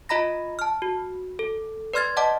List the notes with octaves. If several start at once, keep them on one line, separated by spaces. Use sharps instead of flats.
F4 D#5 A#5 B5 A#6
A5 F6
F#4
A4
B4 D5 C6 F6 G#6 A6
D5 D#5 F#5 A5 D6